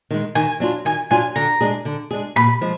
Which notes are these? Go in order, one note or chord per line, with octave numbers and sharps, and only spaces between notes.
D#3 G#3
D#3 G#5
F#3 D4 F4
D#3 G#5
F#3 D4 F4 G#5
D3 A#5
G#3 D4 G#4
D3
G#3 D4 G#4
A#2 B5
F3 G#3